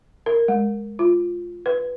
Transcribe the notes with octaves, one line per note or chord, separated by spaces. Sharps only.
A#4
G#3
F4
B4